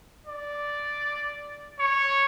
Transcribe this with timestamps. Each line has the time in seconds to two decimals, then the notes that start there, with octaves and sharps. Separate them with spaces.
0.27 D5
1.79 C#5